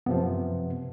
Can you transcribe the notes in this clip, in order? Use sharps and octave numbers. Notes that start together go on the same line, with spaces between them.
F#2 C3 F3 B3